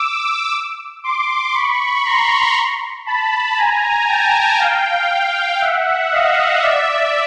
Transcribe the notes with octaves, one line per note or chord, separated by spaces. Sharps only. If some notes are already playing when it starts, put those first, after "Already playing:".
Already playing: D6 E6
C6 D6
B5 C#6
A#5 C6
A5 B5
G#5 A#5
G5 A5
F5 G5
E5 F#5
D#5 F5
D5 E5